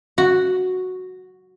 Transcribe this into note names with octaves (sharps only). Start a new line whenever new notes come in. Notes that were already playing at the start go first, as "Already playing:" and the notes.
F#4